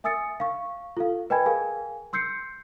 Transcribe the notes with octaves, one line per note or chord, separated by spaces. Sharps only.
E5 G#5 D#6 E6 A6 C#7
F5 C#6
F4 A4 F5
B4 D#5 G5 G#5 B5 G#6
G#4 A#4 F5 G#5
C6 E6 G6 C7 C#7